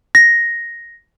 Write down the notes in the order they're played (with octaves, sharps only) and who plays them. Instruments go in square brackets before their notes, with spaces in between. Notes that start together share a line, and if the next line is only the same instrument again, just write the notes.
[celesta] A#6